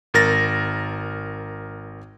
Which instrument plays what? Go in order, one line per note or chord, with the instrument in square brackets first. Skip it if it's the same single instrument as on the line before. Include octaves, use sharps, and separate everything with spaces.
[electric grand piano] G#1 A#4 A6 A#6